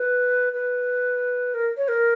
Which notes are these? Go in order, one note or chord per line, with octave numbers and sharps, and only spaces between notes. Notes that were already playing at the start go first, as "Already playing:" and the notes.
Already playing: B4
B4
A#4
C#5
A#4